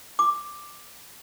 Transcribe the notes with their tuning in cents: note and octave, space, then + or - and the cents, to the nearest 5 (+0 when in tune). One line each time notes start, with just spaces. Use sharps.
D6 +5